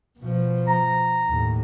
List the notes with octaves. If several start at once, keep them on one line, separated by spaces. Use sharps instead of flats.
B2 F3
A#5
D#2 A2